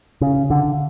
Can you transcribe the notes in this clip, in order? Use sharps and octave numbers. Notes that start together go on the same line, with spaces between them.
C#3
D3